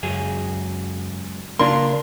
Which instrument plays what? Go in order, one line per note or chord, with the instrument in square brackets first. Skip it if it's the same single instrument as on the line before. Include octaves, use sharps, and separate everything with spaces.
[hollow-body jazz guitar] C#2 F#3 G#4 [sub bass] F#2
[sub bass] C#3 [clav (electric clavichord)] A#3 D4 [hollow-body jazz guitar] F4 A#4 [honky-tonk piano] C6